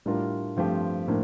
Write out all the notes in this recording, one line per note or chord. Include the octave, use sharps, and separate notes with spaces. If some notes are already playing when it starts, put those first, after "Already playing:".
A2 G3 D4 F4 A#4
G2 F3 A3 C4 G4
A2 F3 A#3 D4